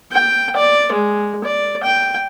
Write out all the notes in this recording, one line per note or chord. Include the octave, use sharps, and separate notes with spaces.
G5
D5
G#3
D5
G5